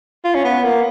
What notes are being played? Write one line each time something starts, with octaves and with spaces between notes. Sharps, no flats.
F4
C#4
B3
A#3